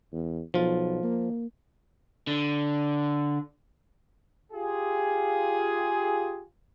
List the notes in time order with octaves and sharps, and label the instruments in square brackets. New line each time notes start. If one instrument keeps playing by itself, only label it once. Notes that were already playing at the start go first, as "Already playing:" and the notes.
[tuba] E2
[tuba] B1 [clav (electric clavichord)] F3 F4
[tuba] A#3
[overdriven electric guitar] D3
[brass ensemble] F4 G4 G#4